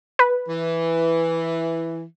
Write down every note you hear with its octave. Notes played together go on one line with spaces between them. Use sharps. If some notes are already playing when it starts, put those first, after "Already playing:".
B4
E3